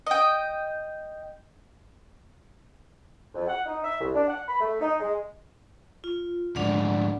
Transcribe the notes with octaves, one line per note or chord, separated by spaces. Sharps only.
D#5 G5
F2
F#5
D#4
E5
C2
D4
F#5
B5
A3
D#4
G#3
F4
D2 G#2 D4 D5 F#5